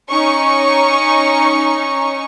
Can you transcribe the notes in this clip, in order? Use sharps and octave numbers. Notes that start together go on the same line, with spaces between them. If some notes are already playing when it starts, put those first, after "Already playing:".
C#4 D#4 C#6